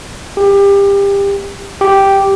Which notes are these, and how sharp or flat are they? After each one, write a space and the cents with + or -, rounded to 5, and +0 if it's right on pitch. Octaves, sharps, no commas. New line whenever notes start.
G4 +25
G4 -5